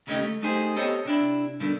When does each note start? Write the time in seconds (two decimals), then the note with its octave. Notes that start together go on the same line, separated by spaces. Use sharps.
0.07 D#2 C#3 A3 D#4 G4 D#5
0.22 A3
0.42 A3 D#4 G4 G#4 C5
0.76 B3 C4 G4 A4 C#5 D#5
1.05 C3 D4 E4
1.60 G2 B2 D3 D#3